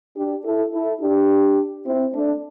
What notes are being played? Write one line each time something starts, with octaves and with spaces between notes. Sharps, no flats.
D4 G4
E4 A4
E4 A4
D4 G4
C4 E4
A3 D4